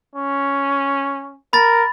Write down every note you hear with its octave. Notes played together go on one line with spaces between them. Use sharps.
C#4
A#4 B5 A6